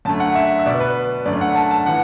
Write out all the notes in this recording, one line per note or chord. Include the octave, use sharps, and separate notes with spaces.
F#2 D3 A3 A5
F#5
E5
E5
B2 B3 D5
B4
F#2 D3 A3 D5
F#5
A5
A5
A2 E3 F#5